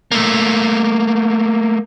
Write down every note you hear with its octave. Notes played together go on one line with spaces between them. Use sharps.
A3 A#3